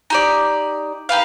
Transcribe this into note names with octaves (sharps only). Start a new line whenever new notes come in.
D#4 G4 D5
D#4 G4 B4 F5